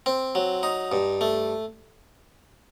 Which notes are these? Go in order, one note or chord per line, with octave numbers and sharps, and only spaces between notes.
C4
F#3
D#4
G2
A3